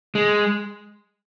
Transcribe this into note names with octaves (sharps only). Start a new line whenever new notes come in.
G#3